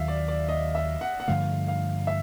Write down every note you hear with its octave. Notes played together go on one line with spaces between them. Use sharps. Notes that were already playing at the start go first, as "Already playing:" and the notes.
Already playing: D#2 D#3 F#3 E5 F5
D5
D5
D#5
E5
F#5
F#5
G2 D3 F3 A3 F5
F5
E5